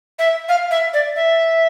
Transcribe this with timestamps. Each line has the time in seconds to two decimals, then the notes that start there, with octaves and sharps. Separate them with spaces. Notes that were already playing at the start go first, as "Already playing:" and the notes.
0.19 E5
0.48 F5
0.71 E5
0.93 D5
1.16 E5